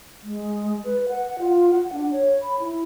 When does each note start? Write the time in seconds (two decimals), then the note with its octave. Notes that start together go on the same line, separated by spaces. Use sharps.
0.23 G#3
0.84 B4
1.09 F#5
1.39 F4
1.71 F#5
1.93 D4
2.11 C#5
2.42 B5
2.60 E4